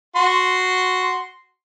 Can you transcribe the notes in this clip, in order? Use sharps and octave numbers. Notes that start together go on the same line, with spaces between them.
F#4 C6